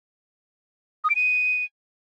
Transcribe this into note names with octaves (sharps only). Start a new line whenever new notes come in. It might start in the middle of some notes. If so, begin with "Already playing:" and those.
D#6
D7
D#7